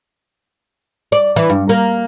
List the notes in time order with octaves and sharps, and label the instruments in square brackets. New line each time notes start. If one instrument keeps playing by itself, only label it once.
[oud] D5
E3
G2
A#3